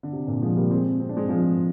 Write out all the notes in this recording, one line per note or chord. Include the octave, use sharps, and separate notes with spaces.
D3
C3
A#2 D3
F3 G#3
G3 A#3
G#3 C4
C4
D4
G#3 C4
F3 G#3